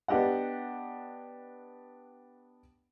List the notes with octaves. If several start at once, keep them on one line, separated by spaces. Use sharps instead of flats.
B3 D4 G4 D#5 F#5